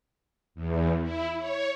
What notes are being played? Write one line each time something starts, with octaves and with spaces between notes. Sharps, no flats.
E2
E4
C#5